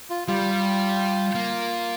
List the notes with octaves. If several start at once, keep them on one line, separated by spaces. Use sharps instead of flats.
F4
G3 F4
A#3